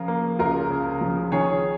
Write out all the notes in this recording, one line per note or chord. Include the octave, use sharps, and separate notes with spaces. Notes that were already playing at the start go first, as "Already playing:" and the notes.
Already playing: C#3 F3 F4 A#4
A#3
C#2 F4 A#4
C#3
F3
D#3 G#4 C#5